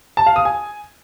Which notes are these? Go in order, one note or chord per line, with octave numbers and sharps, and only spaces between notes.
A5
F5
D#6
G#5